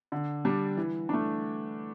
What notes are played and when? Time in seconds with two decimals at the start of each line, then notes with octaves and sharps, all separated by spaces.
0.12 D3
0.45 G3 D4
0.77 E3
1.09 A3 D4